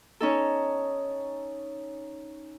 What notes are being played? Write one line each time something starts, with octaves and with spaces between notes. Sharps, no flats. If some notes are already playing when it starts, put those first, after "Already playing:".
C#4 D#4 A4